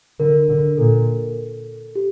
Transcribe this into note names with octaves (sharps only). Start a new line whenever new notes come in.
D3 A#4
D3
A#2 A4
G4